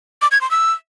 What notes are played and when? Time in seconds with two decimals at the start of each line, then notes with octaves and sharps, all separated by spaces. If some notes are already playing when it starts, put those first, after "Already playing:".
0.22 D6
0.31 G#6
0.41 C6
0.51 E6